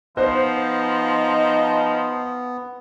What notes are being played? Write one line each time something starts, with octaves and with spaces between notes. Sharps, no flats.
F3 B3 D#4 C5